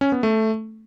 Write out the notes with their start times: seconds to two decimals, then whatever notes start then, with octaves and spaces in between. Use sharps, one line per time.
0.01 C#4
0.12 B3
0.23 A3